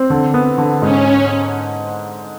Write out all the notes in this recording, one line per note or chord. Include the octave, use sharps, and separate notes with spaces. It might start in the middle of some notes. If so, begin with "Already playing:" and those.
Already playing: C4
D3
B3
D3
G#2 C#4